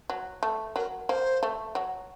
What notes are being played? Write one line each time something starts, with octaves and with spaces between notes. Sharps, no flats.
F#3
A3
F#3 A#4
A#3 C5
A3
F#3